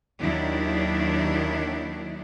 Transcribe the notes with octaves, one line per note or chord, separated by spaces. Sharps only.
D#2 D#3 F#3 D4 E4